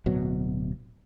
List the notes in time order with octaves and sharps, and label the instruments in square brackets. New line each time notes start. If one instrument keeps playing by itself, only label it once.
[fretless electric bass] D1 B2 F#3